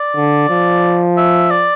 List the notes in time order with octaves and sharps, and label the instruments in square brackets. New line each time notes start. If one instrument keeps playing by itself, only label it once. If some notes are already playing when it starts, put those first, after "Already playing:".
Already playing: [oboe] D5
[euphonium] D3
F3
[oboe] E5
D5